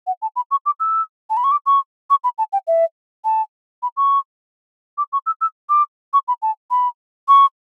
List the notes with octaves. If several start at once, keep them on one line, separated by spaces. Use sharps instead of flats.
F#5
A5
B5
C#6
D6
E6
A5
B5
C#6
D6
C#6
C#6
B5
A5
G5
E5
A5
B5
C#6
D6
C#6
E6
E6
D6
C#6
B5
A5
B5
C#6